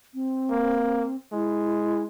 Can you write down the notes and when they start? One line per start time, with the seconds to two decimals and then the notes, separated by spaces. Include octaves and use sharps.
0.14 C4
0.51 A#3
1.33 G#3 E4